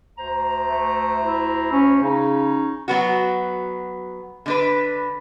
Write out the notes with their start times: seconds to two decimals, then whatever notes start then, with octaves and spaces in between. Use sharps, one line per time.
0.18 D2 C5 A#5
0.68 A3
1.23 E4
1.72 C#4
2.03 C#3 C#4 D#4
2.88 F#3 B3 F#4
4.46 D3 D4 B4